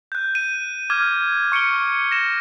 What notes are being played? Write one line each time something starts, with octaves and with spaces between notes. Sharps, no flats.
F#6 G6
D#7
D6 F6 G#6
C#6 C#7 D7 G7
A#6 E7